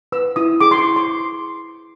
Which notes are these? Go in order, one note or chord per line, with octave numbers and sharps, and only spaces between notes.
B4 E6
E4 D#6
G#4 D6
C6
C#6
E4
C6